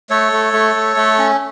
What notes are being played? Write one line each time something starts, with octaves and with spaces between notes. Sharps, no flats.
A3 A4 C#5
A3
A3
A3
A3
C#4